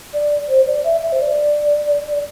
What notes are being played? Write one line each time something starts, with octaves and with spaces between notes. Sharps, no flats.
D5
C5
D5
E5
E5
C5
D5